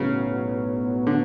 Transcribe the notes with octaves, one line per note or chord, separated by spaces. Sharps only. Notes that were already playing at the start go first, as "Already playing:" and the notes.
Already playing: B1 A2 C#3 F#3 B3
D3